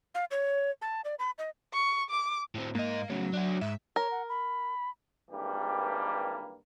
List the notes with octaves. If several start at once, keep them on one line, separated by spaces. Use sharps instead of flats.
F5
C#5
A5
D5
B5
D#5
C#6
D6
A2 C4
G#2 A#3 D#5
A2 C#3 F#3
D4 F#4
G#2 E5
A#4 C#5
F#5
B5
G#1 G2 E3 G3 A#3 G4